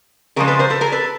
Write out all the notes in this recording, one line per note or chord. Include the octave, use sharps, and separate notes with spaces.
C#3 F3 G#3 G#4 A#4
A4 B4
A#4 C5
A4 B4
G#4 A#4
A4 B4